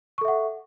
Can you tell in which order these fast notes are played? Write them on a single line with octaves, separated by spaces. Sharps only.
C#6 A4 E5 F#5